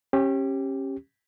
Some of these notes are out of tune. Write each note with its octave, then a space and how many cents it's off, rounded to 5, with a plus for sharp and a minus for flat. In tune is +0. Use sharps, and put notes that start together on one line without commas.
C#4 -30 G4 +0